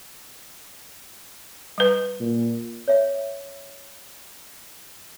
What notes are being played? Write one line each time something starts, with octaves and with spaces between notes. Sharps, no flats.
G3 B4
A#2
C#5 E5